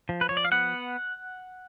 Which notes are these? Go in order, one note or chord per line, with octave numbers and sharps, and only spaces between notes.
F3
B4
F3 C#5
D5
F5
B3 F#5